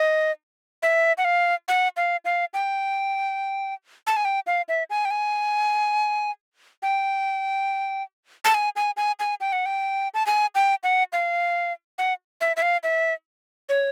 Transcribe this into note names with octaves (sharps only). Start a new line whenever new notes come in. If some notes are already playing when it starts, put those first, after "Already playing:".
Already playing: D#5
E5
F#5
F5
F#5
F5
F5
G5
A5
G#5
G5
F5
E5
G#5
G5
G#5
G5
A5
G#5
G#5
G#5
G#5
G5
F#5
G5
A5
G#5
G5
F#5
F5
F#5
E5
E5
F5
E5
C#5